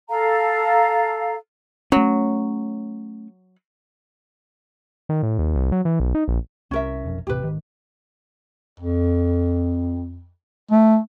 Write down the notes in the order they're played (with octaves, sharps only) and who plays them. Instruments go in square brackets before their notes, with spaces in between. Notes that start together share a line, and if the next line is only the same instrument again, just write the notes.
[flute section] A4 F5 A#5
[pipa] F#3 [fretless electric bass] A3 C#4
[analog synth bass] D#3
A2
D#2
C2
F#3
E3
B1
D#4
A#1
[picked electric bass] C2 [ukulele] C#4 A#4 E5
[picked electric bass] F1 B1 F2
[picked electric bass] D#1 A1 C3 [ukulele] G4 B4
[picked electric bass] G#1 D#3
[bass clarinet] F2
A3